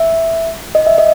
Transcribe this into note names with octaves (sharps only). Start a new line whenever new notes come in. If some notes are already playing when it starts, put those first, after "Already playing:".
Already playing: E5
D#5
E5
D#5